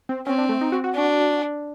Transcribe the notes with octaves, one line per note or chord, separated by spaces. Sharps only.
C4
C4 C#4
D4
A3
D#4
F#4
F#4
D4